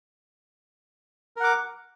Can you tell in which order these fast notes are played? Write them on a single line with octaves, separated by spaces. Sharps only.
A#4 F#5 D6